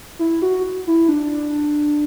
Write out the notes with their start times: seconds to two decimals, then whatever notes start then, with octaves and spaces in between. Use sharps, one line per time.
0.19 E4
0.42 F#4
0.87 E4
1.09 D4